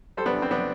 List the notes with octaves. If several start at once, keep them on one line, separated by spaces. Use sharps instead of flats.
G3 A4 C5
B3 D4
D2
C4
B3 D4